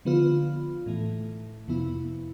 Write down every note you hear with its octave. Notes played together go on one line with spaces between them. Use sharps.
D3 F3 B3 F4
A2 E3 A3
F2 C3 F3 B3 E4